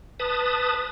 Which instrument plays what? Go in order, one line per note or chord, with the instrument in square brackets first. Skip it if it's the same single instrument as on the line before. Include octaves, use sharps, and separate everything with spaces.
[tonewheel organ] B4 A5 D#6